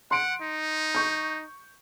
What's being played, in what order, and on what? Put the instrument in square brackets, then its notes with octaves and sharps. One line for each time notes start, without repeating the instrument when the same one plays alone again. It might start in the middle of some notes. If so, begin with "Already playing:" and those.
[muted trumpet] F#5 [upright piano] C6 D7
[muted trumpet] D#4
[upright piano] C#6 G6